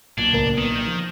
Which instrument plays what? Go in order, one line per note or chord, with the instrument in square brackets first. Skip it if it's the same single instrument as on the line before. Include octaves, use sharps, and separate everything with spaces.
[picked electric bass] B1 A#2 [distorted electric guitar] D4 [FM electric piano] G#6
[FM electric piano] C#2 A2 A#4
[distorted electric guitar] D#3 [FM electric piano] B3
[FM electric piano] G6 A#6
[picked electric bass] F3